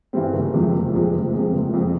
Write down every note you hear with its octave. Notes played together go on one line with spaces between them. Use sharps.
G2 E3 G3 C4
F#1
F2 C3 F3 G#3
F#1
F2 C3 F3 G#3
F#1
F2 C3 F3 G#3
F#1
F2 C3 F3 G#3